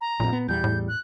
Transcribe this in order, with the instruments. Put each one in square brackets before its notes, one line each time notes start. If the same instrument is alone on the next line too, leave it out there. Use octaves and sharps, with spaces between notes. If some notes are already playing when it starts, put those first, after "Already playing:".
[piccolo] A#5
[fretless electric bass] A#1 F2 [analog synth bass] A#2
[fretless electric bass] B3
[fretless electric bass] E2 G3 [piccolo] G6
[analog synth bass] A2
[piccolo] F#6